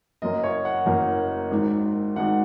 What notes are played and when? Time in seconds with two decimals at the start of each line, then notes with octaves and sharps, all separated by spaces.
0.22 F#1 F#2 F#3 A#3 D#5
0.43 C#5
0.65 F#5
0.86 F#1 F#2 F#3 A#3
1.51 G#1 G#2 D#3
2.15 G#1 G#2 D#3 F#5